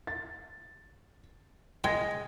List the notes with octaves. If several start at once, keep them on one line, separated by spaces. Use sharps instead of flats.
A6
G#3 G5 G#6 A#6